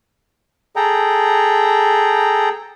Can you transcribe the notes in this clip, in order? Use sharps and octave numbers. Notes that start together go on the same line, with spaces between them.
G#4 A4 G5 A#5